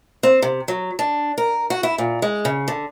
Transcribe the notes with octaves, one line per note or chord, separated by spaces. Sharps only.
C4
C3
F#3
D4
A#4
F#4
E4
A#2
G#3
C#3
D3